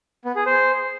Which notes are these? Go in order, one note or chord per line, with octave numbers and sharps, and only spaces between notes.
B3
G#4
C5